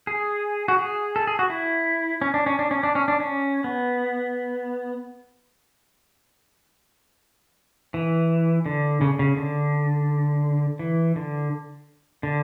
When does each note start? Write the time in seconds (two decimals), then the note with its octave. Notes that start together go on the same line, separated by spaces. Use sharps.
0.07 G#4
0.68 F#4
0.79 G#4
1.16 A4
1.27 G#4
1.39 F#4
1.50 E4
2.21 C#4
2.34 D4
2.46 C#4
2.59 D4
2.71 C#4
2.83 D4
2.95 C#4
3.08 D4
3.20 C#4
3.64 B3
7.94 E3
8.66 D3
9.01 C#3
9.19 C#3
9.37 D3
10.79 E3
11.16 D3
12.23 D3